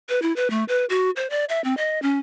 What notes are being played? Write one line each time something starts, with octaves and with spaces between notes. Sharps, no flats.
B4
E4
B4
A3
B4
F#4
C5
D5
E5
C4
D#5
C#4